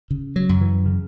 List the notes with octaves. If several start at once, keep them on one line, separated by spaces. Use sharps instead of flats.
C#3
F#3
F#2
E3
C#3